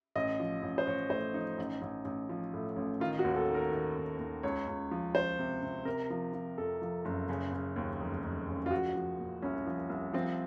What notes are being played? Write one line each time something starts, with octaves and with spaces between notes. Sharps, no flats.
A1 D#5
F3
A1
C5
A1 C#5
A2 C5
F3 D#4
A1 D#4
A1
A1
F3
A2
A1
D#3 F4
F#4
D#2
A4
D#3
A#4
D#3
D#2
D#2
C#2 C#5
C#2
F3
F3 C5
C3
C3
C3 A#4
F3
F3
F2 A4
F3
F#1
C#3
C#3
D#2
F1
F1
C#3
F4
F3 F#4
F3
A#2
C2 C#4
F3
C2
F3 C4